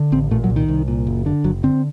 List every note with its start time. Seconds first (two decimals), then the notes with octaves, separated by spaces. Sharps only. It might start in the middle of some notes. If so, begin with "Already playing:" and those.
Already playing: D3
0.12 A1 C4
0.31 A#2 A3
0.44 F#3
0.50 C2
0.56 D#3
0.68 C2
0.88 A#2
1.07 F#1
1.26 D3
1.44 F#1 F#3
1.63 D3 C4